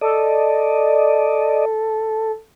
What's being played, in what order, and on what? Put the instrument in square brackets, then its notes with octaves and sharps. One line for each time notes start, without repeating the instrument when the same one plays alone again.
[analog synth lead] A4 [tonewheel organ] D5 D#5